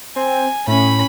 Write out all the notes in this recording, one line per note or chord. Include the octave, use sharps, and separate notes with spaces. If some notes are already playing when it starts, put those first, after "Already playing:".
C4 G#5
A2 C#4 B5